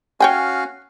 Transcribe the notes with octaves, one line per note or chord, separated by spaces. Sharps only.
C#4 F#4 C#5 F5 G5 G#5